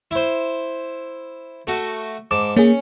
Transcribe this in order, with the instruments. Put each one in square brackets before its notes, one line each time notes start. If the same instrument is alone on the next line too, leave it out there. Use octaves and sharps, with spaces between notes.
[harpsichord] E4 C5
A3 F#4
[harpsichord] G#2 A5 [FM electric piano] D6
[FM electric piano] A#3 G#4 [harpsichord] C#4